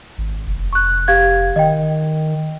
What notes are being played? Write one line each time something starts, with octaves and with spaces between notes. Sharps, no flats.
G#1
F1
C#6 F#6
G4 F5 G#6
D#3 D#5 G5